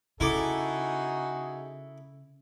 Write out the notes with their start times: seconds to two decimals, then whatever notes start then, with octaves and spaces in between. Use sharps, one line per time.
0.20 C#3 D#4 E4 F#4 G#4 A4 D6